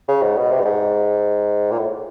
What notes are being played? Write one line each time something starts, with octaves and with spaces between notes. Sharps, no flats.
C#3
G#2
B2
C3
G2
G#2
A#2
A2